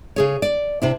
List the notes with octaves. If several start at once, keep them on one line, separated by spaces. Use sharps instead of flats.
C#3 G#4 C#5
D5
C3 D4 E4